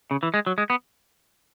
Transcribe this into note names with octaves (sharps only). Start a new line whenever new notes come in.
C#3
E3
G#3
F#3
G#3
B3